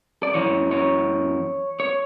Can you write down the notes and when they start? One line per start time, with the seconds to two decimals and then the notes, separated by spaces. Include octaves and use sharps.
0.23 D5
0.34 F#2 C#3 E3 C#5
0.71 C#5
1.80 C#5